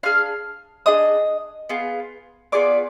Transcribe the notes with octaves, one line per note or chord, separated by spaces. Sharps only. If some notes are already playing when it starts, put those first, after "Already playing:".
D4 G#4 F5 F6
D4 G#4 D#5 D#6
B3 F4 G#4
B3 F4 G#4 D5 D6